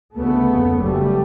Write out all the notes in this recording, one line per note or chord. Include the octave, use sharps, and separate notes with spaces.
D2 C#3 A3 B3
F#1 F2 C#3
F#1 F#2 C#3 G3 A3